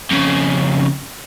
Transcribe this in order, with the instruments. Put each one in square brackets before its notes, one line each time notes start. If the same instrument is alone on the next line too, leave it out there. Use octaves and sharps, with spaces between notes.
[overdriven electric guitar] F2 C#3